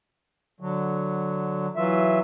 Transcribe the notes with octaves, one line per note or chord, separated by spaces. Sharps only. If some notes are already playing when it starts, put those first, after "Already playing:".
D3 F#3
E3 F#3 F4 E5